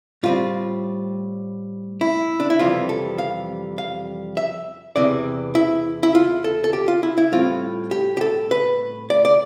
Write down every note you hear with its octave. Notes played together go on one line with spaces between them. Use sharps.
A2 G3 C4 F4
E4
D4
E4
F2 C3 E3 G3 F4
A4
F5
F5
E5
E2 C3 E3 D5
E4
E4
F4
A4
A4
G4
F4
E4
E4
A2 G3 C4 F4
G4
G4
A4
B4
D5
D5